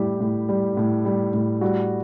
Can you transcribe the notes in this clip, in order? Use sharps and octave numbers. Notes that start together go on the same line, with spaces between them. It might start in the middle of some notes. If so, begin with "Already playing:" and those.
Already playing: A2 G3 E4 G4
A2
G3
A2
G3
A2
G3 F#4